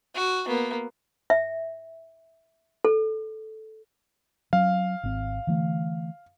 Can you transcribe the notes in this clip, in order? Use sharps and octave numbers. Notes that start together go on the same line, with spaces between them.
F#4
A#3 B3
E5
A4
F#3 C#4 F5
G#1 C4
D3 E3 A3